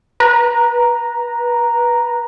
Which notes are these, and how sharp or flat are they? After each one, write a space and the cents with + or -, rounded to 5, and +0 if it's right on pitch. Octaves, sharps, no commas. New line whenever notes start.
B4 -20 A#5 +0